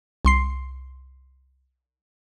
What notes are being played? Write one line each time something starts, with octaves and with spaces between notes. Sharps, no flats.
C2 C6 C7